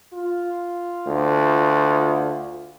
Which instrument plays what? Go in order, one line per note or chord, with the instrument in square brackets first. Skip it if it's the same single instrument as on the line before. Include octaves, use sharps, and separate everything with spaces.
[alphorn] F4
[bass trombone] D2